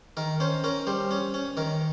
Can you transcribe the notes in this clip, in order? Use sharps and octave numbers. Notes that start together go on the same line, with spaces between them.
D#3 A#4
C#4 C5
C#4 A#4
G3 C5
C#4
C#4
D#3 A#4